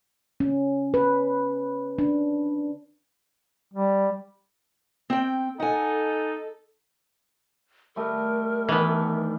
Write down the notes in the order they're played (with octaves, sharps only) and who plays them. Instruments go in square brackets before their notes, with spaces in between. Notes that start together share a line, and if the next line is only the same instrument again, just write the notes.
[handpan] C#4
B4
D4
[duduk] G3
[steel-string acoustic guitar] C4 G5
[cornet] D#4 [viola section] A4 [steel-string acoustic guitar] F#5 G#5
[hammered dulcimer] G3 A3 D#5 [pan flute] A#4
[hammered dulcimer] D#3 A3 D4 [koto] E3 B3